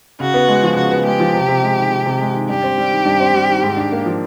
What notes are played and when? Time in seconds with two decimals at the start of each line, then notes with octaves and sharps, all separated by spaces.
0.20 C#3 F#4
0.34 B3
0.48 G#3
0.63 F3
0.77 C#3 F#4
0.91 B3
1.05 G#3 G4
1.20 F3
1.34 C3
1.48 C3
1.63 G#3
1.77 D#3
1.91 C3
2.06 C3
2.20 G#3
2.34 D#3
2.49 G2 G4
2.64 C4
2.78 G3
2.91 D#3
3.05 G2
3.20 C4
3.34 G3
3.48 D#3
3.63 G#2
3.77 D4
3.92 A#3
4.06 F3